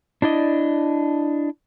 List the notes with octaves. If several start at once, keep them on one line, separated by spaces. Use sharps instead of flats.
D4 E4 D5 D#5